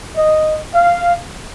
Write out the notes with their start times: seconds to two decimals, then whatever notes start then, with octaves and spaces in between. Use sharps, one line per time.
0.16 D#5
0.73 F5